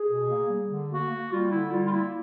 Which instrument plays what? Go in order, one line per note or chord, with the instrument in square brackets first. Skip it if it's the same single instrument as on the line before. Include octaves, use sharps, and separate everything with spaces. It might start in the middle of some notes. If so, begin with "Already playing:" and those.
Already playing: [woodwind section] G#4
B2
A#3
G3
D3
A#3 F#4
A#3
G3 F4
D3 E4
G3 F4
F4
A#3 E4